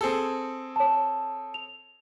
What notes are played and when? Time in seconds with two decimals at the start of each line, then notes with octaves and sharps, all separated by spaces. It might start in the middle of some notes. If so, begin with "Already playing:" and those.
0.01 C4 G#4 A4
0.76 C#5 A5
1.54 F7